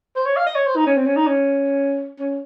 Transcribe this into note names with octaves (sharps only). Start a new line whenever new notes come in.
C5
C#5
F5
D#5
C#5
C5
D#4
C#4
C4
C#4
D#4
C#4
C#4